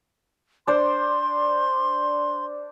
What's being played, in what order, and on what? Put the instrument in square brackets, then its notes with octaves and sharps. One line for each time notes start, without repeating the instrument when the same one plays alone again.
[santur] D4 C5 [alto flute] C6